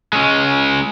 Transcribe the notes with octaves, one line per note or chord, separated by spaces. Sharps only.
G#3 C#4